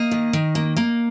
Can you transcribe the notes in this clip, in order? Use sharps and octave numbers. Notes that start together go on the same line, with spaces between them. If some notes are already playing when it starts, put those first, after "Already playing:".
Already playing: A#3 D#5
D#3
D#3
A#3
A#3